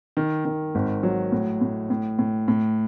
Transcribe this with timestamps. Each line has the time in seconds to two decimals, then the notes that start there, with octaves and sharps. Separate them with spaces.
0.17 D#3
0.45 D#3
0.75 G#1
1.03 F#3
1.32 A2
1.61 A2
1.90 A2
2.19 A2
2.48 A2